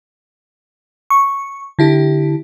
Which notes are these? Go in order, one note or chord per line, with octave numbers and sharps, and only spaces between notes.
C#6
D3 E4 G4